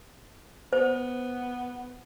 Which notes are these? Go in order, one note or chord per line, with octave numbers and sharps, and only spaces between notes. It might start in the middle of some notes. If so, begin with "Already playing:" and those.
B3 C5